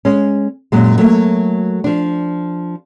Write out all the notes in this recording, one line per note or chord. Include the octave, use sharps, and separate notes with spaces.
G#3 C#4
F#2 A#2 F#3 G#3
F#3 A3 A#3
F3 D4